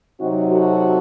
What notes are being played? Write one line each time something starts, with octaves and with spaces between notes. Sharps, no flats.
C3 F#3 C4 D#4 F#4
F#4 A4